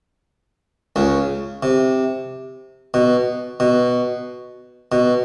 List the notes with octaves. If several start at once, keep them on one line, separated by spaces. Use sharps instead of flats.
C#2 C#3
C3
B2
B2
B2